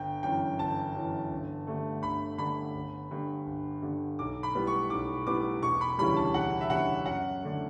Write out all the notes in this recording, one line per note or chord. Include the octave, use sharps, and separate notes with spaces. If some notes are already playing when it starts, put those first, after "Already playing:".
Already playing: G1 G5
F#2 E3 G5
G1 A5
F#2 E3
G1
G2 D3 A3
G1 B5
G2 D3 A3 B5
G1
G2 D3
G1
G2 D3
B1 D6
B5
A2 G3 B3
C#6
B1 D6
A2 G3 B3 D6
E1 C#6
B5
D2 C#3 E3 G3 B5
A5
E1 F#5
E5
D2 C#3 E3 G3 F#5
F#2 F#5
D3 A3